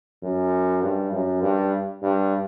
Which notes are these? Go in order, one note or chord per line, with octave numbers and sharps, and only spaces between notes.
F#2
G2
F#2
G2
G2